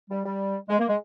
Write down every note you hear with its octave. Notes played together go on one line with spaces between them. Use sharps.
G3
G3
G#3
A#3
G#3